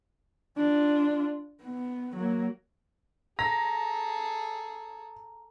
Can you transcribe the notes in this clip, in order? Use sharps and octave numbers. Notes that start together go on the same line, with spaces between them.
D4 F4
B3
F#3 A#3
G#4 A4 A#5 A#6